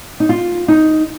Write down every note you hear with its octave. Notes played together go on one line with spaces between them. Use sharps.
D#4
F4
D#4